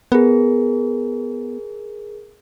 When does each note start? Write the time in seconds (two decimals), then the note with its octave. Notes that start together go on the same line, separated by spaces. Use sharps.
0.12 B3 G#4 A#4